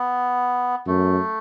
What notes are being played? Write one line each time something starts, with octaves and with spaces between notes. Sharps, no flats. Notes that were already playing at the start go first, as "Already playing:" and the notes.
Already playing: B3
F#2 A3